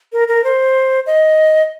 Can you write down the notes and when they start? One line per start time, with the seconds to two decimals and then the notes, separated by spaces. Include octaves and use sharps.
0.13 A#4
0.28 A#4
0.44 C5
1.06 D#5